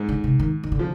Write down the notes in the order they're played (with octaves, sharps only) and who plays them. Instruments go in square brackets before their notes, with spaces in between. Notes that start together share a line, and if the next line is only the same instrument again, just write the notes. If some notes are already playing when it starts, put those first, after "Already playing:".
Already playing: [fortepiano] G#2
[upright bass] D3
C3
D#3
D#3
D3
[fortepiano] F3